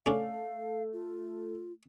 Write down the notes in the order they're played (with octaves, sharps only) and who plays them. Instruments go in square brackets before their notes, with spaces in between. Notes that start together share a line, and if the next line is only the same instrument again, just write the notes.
[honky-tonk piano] A3 [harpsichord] C#4 D4 [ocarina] F5
[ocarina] F4